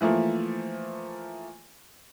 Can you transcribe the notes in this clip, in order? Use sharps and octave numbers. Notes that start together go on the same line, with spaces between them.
E3 F3 A3 A#3